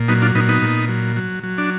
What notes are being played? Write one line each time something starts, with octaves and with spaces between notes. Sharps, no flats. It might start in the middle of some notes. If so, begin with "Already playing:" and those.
Already playing: A#2
F#3 B3 D#4
D4 F4
A#2 B3 D#4
B3 D#4
A#2
F#3
F#3
F#3
D4